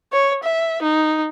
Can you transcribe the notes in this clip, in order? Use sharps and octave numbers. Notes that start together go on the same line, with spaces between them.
C#5
E5
D#4